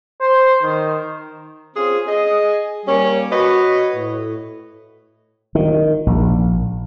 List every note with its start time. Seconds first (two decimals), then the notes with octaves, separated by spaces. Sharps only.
0.21 C5
0.63 D#3
1.76 C4 C#4 F4 G#4
2.07 G#4 D#5
2.86 G3 A#3 C#4
3.32 F#4 B4 C#5 D#5
3.95 A2
5.55 D#3
6.06 A#1